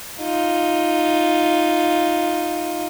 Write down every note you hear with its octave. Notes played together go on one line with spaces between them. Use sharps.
D#4 F4